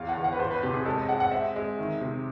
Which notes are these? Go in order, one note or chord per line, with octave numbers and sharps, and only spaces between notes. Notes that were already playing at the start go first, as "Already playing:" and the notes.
Already playing: E2 F5
F#5
E2
F#5
B4
E2 C5
B4
C3 G4
G#4
G#3 A4
D#5
G#3 F#5
F#5
C4 E5
G#3
D#3
C3